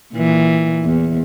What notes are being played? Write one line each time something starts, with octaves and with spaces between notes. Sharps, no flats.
A#2 E3
E2